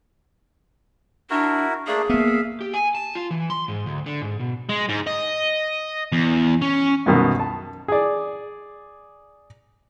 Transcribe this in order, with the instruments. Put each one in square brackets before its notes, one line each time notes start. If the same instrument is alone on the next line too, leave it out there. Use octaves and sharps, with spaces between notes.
[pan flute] D4 [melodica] E4 F#4 A#4
[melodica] A3 A#3 D4 [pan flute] G#4
[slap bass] A#3 B3 [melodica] E5 F5
[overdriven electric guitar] G4
G#5
A5
F4
E3
C6
G#2
D2
D3
G#2
B2
[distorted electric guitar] G#3
G#2
D#5
E2
C#4
[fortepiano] C2 F#2 B2 D#3
A5
G#4 D5